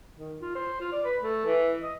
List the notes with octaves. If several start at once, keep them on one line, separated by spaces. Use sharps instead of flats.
D#3
F4
C5
F4
D5
B4
A3
E3
D#5